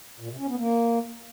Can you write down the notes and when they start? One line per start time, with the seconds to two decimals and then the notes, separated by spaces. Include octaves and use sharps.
0.20 A#2
0.29 C3
0.39 C#4
0.48 B3
0.57 A#3